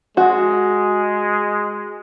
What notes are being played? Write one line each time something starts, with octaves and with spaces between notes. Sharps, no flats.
G#3 F#4